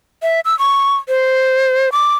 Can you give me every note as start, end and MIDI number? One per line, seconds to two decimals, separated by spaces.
0.23 0.40 76
0.45 0.57 88
0.59 0.96 85
1.09 1.92 72
1.92 2.16 86